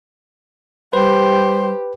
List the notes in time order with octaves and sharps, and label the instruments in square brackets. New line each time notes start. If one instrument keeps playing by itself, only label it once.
[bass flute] G3 [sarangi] G4 [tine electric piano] B4 [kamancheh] C5